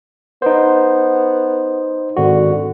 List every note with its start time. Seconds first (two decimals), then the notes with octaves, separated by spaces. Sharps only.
0.42 B3 D#4 C5
2.17 G#1 D3 F#4